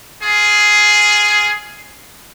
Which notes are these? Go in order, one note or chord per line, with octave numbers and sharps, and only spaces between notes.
F4 G#4